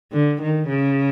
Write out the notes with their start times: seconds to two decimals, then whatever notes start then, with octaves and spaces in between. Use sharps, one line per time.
0.12 D3
0.41 D#3
0.69 C#3